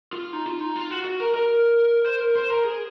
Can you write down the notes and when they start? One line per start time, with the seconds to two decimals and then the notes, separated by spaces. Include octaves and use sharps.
0.13 F4
0.33 D#4
0.46 F4
0.61 D#4
0.76 F4
0.91 F#4
1.05 F#4
1.20 A#4
1.34 A#4
2.06 C5
2.20 A#4
2.35 C5
2.50 A#4
2.64 G#4